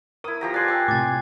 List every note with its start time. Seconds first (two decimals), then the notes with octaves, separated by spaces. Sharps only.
0.24 E4 A#4 D#6
0.41 F3 G4 A#5 A#6
0.54 D5 G#5 C6 F#6 A6 C7
0.68 G5 E6
0.88 A2 C3 D6 A6